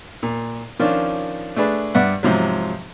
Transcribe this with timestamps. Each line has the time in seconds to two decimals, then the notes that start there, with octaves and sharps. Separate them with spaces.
0.23 A#2
0.79 D#3 F3 C#4 D4 F4
1.56 A3 D4 G#4 B4 D5
1.95 G2 B4 D5 E5 F#5
2.23 G#2 C3 F3 F#3